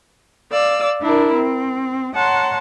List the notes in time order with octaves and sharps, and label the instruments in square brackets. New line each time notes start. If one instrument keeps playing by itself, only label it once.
[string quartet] D5 F5 E6
D4 E4 A#4
C4
C#5 F#5 A5 A#5 C6